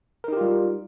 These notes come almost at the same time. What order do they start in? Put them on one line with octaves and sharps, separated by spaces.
A#4 D#4 G4 F4 G3